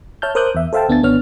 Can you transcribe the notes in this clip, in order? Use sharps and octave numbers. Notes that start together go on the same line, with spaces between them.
C#5 E5 A5 F6 G6
A#4 C5 D6 D#6 F#6 G6
E2 E5
A4 C5 E5 F5 G5 A5
D2 B3 D4 G#5 A6
G#1 B3 D4 C#5 F6